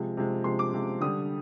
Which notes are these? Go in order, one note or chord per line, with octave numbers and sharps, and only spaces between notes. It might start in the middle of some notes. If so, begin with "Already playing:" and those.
Already playing: C3 F3 G#3
C3 F3 G#3
C3 F3 G#3 C6
D6
C3 F3 G#3
D3 G3 D#6